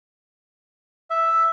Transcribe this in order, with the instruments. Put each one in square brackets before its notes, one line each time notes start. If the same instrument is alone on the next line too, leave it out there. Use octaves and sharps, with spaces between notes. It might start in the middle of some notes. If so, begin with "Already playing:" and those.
[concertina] E5